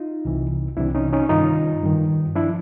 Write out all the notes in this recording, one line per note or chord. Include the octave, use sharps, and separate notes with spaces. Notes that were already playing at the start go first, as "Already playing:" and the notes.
Already playing: D#4 F4
C2 C3 E3
C2 C3 E3 D4 E4
C#4 D#4
C#4 D#4
G2 D#3 D#4 F4
G2 D#3
F3 D4 E4